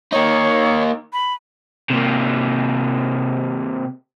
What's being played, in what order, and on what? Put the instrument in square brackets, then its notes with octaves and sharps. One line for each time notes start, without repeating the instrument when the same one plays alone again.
[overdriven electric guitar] A#3 D#4 [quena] C#5
[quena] B5
[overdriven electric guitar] C3 A#3